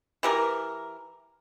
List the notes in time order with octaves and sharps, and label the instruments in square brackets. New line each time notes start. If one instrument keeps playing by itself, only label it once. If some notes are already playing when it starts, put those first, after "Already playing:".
[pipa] E3 G4 A#4